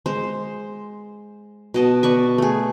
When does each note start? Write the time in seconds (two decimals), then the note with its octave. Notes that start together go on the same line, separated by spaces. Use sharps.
0.06 G#3 C5
1.74 B2 D#5 A5
2.03 B4 D5 C#6
2.38 A3 G#4